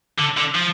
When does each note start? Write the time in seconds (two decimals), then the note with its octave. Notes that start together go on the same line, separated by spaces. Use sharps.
0.19 D3
0.37 D3
0.55 F3